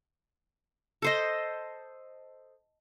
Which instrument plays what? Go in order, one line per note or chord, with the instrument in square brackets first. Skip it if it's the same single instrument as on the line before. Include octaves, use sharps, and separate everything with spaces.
[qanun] A4 C5 D#5